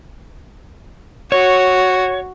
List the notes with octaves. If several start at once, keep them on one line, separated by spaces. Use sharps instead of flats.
F#4 C#5